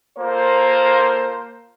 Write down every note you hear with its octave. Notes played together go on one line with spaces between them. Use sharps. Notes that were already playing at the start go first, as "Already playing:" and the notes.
A#3 F4 A4 A#4 C5